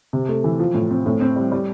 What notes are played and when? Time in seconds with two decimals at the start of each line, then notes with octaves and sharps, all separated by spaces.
0.13 C3
0.29 A3
0.44 E3
0.59 F3
0.74 A2
0.91 C4
1.06 A2
1.21 C4
1.36 G3
1.52 G3